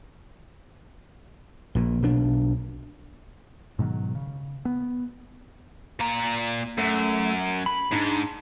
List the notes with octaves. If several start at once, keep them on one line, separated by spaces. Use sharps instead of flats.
A#1 A#2
B1 B2 D4
G#2 B2 D#3 F#3
C#3
B3
A#2 A#5
F#2 A3
B5
G#2 D4 D#4